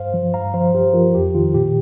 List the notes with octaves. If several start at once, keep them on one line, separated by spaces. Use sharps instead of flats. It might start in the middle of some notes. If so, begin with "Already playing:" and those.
Already playing: G2 C5 F5
F3
G2 F5 A#5
F3 C5 F5
G2 G4 C5
F3 F4 A#4
F2 G4
D#3 F4
A#2 G4